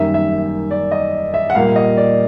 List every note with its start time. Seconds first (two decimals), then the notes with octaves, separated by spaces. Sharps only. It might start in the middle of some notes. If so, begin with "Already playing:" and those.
Already playing: F#2 D#3 G3 A#3 E5
0.14 E5
0.71 D5
0.91 D#5
1.34 E5
1.50 F#5
1.55 A#2 G3 A#3 F5
1.76 D#5
1.97 D5